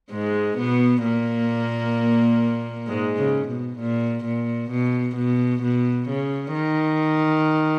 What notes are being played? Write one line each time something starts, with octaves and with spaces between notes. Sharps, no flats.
G#2 G#3
B2 B3
A#2 A#3
G#2 G#3
C#3
B2
A#2
A#2
B2
B2
B2
C#3
D#3